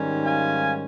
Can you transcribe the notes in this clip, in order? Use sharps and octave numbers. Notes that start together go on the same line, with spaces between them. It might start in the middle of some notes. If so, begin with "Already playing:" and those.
Already playing: G#2 D#3 G3 C#4
F5 G#5